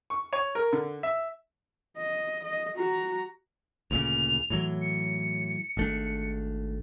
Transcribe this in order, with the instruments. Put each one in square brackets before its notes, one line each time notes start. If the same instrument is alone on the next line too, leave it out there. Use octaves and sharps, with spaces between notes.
[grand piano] C#6
C#5
A#4
D3
E5
[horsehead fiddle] D#5
D#5
F#4 A#5
[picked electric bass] D2 A#2 C#3 [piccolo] F7
[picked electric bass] A2 E3 F#3
[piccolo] C#7
[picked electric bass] G#1 A3 D4